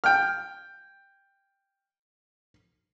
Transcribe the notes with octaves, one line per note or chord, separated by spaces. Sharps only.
G5 F6